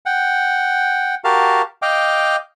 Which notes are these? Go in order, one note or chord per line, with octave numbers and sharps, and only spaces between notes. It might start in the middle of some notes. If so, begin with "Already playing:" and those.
F#5 G5
F#4 G4 A#4 F5 A5
D#5 F5 G5 D6